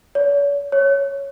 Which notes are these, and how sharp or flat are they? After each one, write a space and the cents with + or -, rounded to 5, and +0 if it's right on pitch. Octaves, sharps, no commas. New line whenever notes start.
C#5 +45
C#5 +0